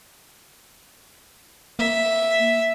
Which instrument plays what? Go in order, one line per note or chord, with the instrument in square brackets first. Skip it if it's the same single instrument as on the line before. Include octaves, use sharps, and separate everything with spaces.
[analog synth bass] A#3 [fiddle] E5